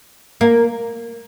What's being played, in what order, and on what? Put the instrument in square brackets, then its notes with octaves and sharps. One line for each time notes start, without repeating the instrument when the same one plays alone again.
[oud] A#3